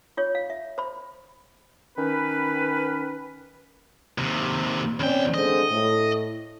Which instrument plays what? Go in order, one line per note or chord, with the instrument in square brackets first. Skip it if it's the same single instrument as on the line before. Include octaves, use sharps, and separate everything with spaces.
[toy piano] F4 C#5
F5
E5
C5 B5
[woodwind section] D#3 C#4 B4
[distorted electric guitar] D#2 C3
[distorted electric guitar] E2 G5 [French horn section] C4 C#4 D5
[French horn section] D3 G#3 C4 [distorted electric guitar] D#5
[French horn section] A2